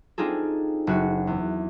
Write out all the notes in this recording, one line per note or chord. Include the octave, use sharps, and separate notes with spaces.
C4 D4 D#4 F4 G#4 A4
F#1 F#4
E2